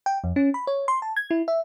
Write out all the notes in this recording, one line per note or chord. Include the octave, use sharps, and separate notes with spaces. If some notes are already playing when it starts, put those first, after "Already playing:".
G5
F2
C#4
B5
C#5
C6
A5
G#6
E4
E5